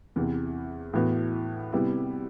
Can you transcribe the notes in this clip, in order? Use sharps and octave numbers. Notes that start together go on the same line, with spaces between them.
E2 C3 E3
A2 E3 B3 F#4
C3 G3 B3 E4